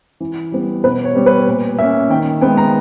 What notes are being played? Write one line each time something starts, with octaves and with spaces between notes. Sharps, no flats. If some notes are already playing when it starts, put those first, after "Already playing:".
E3
G3 B3
B2 B4
C#5
G3 B3
B4
A#2
A#3 C#4 E5
D#3 G5
G#3 B3 G5
A#5